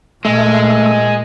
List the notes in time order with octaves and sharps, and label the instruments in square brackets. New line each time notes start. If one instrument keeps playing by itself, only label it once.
[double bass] A#2 [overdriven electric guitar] G#3 [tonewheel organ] A3